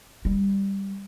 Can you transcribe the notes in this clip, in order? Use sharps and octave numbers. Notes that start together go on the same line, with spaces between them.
G3